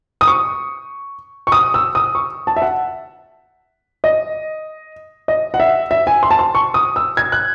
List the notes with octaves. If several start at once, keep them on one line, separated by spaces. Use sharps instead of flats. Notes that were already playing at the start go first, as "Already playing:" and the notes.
D#6
C#6
C#6
D#6
E6
D#6
C#6
A5
E5
F#5
D#5
D#5
F#5
E5
E5
G#5
C6
A5
C6
C#6
D#6
E6
G#6
F#6